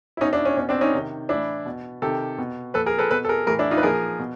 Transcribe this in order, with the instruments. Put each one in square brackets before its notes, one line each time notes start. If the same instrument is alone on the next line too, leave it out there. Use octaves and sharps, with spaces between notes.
[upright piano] E4
B2 C#4 D#4
D4 E4
C#4
B2 C#4
C4 D4
C#4 D#4
C3 D#3
A2 E3 D4 E4
B2
C3 D#3 G4 A4
B2
A#2 F3 A4 B4
G#4 A#4
A4 B4
B2 A4 B4
A4
G#4 A#4
A2 E3 G#4 A#4
D4 E4
D#4 F4
B4
A#2 F3 G#4 A#4
B2